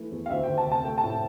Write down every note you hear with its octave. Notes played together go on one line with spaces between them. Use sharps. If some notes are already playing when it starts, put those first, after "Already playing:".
Already playing: E3 A3
E2
F5
D2 E5
D2 G5
A5
C3
A5
A3 G5
A5
A2
G5